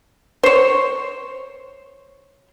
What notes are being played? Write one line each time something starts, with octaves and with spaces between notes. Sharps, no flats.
C5 C#5